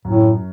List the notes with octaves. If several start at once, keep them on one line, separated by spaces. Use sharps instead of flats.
F#2 A2